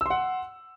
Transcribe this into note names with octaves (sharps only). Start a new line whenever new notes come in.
F#5 C6 E6